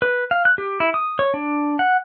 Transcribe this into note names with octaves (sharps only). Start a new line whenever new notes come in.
B4
F5
F#6
G4
E4
D#6
C#5
D4
F#5